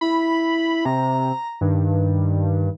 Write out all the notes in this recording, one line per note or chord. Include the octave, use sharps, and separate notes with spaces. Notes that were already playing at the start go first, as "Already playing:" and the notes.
E4 B5
C3 A#5
G2 D#3